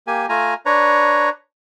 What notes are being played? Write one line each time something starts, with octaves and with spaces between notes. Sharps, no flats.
A#3 G4 G#5
A3 F4 G#5 A#5
D4 B4 C#5 A#5